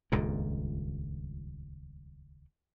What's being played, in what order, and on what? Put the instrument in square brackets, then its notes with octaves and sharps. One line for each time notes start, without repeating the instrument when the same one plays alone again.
[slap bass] D#1 C#2 G2 A#2